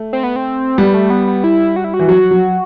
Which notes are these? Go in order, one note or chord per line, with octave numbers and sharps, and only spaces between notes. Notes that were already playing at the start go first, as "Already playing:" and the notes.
Already playing: A3
C4
B3
C4
G3 B3
A3
B3
B3
E4
F#4
E4
F#4
E3
F#3 F#4
F#3